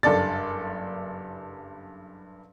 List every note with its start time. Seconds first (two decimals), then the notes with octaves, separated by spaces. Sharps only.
0.03 F#1 G2 A4 D5 A6